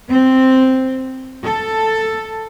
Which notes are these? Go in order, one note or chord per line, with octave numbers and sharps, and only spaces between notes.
C4
A4